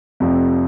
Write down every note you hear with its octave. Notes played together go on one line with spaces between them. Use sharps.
F1 F2 C3 F3